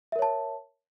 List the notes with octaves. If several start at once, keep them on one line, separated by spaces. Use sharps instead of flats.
A#4 C#5 E5 A5